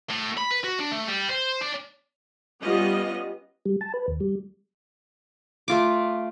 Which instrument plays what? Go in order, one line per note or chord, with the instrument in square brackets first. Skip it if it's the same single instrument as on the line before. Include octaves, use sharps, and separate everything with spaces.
[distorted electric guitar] A2
B5
B4
F#4
D4
A3
G3
C5
D4
[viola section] G3 B3 C#4 F4 D#5
[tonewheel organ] G3
A5
B4
D#2
G3
[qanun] A3 F4 D6